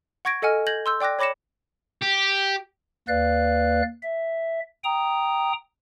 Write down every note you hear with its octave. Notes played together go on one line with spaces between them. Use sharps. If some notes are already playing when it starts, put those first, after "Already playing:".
F#5 C#6 G#6 A#6 D7
A4 D#5 F#5 G#5 F6
G6 G#6 A#6 F#7
C6 E6 G6
D5 G5 D6 F#6 A#6
C#5 B5 D6 A#6 C#7 E7
G4
D#2 A#3 B4 D5 F5 F#6
E5
G5 A#5 D#6